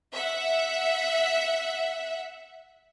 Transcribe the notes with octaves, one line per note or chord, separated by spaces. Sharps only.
E5 F#5